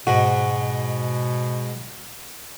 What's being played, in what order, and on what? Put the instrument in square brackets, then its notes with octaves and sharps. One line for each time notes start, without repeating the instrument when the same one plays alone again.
[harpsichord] G#2 [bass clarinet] B2 [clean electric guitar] F#4